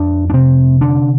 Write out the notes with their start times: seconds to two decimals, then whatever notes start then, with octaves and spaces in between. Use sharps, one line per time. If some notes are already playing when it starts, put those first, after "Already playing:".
Already playing: F2 D4
0.30 D4
0.33 C3 C4
0.81 D3 D4